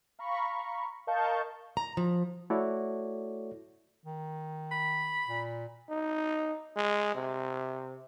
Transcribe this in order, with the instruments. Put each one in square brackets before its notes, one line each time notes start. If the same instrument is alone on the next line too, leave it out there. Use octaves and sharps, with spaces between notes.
[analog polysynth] F5 A#5 B5 C#6
A#4 D#5 F5 A5 C#6 G6
[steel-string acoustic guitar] A#5
F3
[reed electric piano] A3 E4 F#4 A4 C#5 D5
[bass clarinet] D#3
[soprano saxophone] B5
[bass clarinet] A#2
[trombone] D#4
G#3
C3